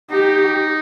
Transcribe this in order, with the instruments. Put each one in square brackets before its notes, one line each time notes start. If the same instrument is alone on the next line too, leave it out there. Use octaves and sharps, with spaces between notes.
[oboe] D#4 [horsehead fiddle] G4